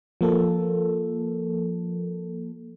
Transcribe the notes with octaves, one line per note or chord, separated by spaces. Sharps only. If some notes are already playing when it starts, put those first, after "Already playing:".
F3 A#3 A4